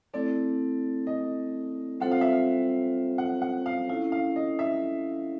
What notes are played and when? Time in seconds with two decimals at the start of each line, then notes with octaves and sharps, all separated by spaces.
0.14 A3 C4 E4 A4 D5
1.07 D#5
2.00 G3 C4 F4 A4 C5 F#5
2.11 F5
2.21 E5
2.32 F5
3.18 F#5
3.42 F#5
3.66 F5
3.89 C#4 E4 A4 F5
4.12 F5
4.36 D#5
4.59 E5